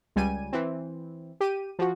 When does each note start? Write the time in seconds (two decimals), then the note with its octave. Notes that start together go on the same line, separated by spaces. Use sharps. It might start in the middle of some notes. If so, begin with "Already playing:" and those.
0.16 C#2 G3 G#5 D#7
0.53 E3 C4
1.40 G4 D#7
1.79 F3 F#4